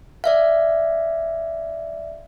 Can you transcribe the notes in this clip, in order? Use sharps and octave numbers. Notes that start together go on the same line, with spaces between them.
D5 E5 F5